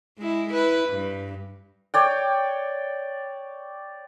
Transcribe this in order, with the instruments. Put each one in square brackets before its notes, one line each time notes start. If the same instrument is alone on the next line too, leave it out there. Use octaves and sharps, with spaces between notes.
[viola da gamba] G#3 E4
E4 B4
G2
[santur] C#5 D5 G5